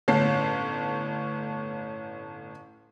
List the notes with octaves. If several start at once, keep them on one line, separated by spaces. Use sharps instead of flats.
G1 A2 C#4 A5 C7